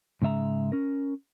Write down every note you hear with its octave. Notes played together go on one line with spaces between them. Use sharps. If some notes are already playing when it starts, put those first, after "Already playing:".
G#2 C#3 G#3 E5 A#5
C#4 A#4